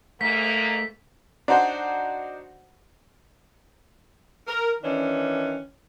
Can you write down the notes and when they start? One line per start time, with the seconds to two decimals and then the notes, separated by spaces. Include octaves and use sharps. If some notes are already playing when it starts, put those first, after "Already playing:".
0.21 G#2 A3 A#3 B6
1.48 D4 D#4 F#4 C5
4.47 A#4
4.82 D#3 E3 C#4 D4